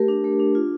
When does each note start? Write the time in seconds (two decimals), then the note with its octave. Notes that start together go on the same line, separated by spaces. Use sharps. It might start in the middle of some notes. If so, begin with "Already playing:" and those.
Already playing: A3 G4 A#4
0.08 D4
0.24 A3
0.40 D4
0.55 F4